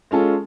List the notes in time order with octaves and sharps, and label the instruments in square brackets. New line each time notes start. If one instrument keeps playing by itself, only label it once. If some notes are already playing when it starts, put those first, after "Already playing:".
[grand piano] G#3 C#4 F4 A4